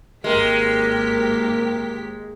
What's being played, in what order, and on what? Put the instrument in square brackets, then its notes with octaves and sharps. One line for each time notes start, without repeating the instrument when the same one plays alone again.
[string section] G#1 G4 B6 [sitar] G#3 [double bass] A#3 [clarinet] A#4